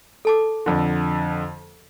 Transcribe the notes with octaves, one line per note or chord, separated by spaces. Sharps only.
A4 A5 D6
F2 D3